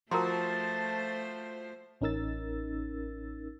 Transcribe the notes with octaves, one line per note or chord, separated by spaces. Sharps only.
F3 A3 F#4 A#4 C5 A5 A#5 C6
A1 C#4 D#4 A#4 E6 A6